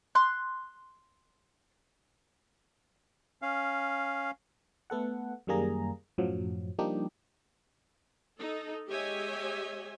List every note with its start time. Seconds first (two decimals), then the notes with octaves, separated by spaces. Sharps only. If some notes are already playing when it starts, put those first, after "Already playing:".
0.15 C6 F#6
3.42 C#4 F5
4.90 A3 B3 A4 F#5
5.47 F#2 D#3 G3 A#3 G#4 A#5
6.18 F#2 A2 F3 F#3
6.79 F3 G3 A#3 D4 D#4 G4
8.39 D#4 A4
8.90 G#3 G4 C#5 D#5 E5 G#5